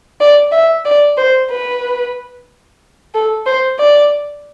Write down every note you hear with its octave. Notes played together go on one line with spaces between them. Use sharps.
D5
E5
D5
C5
B4
A4
C5
D5